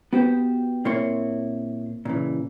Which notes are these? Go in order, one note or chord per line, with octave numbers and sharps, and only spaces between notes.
B3 F#4 G4 B4 C5
A#2 A#3 C4 E4 C#5 C6
A#2 C#3 E3